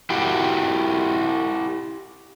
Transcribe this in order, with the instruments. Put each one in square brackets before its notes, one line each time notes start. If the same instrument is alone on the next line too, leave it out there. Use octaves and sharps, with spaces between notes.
[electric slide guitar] E4 F#4 G4